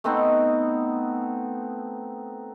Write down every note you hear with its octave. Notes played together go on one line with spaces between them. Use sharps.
A3 B3 C4 D#4